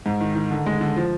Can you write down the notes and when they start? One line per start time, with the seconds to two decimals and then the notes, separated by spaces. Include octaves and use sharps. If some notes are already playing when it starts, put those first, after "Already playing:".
0.06 G#2
0.20 D#3
0.35 D#3
0.51 D3
0.66 G#3
0.81 D3
0.96 F3